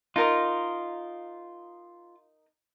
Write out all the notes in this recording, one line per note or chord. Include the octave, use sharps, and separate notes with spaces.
D#4 F4 A#4 D#5